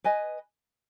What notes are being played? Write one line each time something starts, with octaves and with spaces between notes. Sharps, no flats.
B4 D#5 G#5